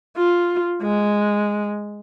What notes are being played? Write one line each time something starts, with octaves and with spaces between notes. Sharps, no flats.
F4
G#3